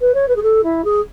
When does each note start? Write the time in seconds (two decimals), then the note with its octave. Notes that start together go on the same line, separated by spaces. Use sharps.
0.01 B4
0.14 C#5
0.28 B4
0.35 G#4
0.42 A4
0.63 E4
0.84 G#4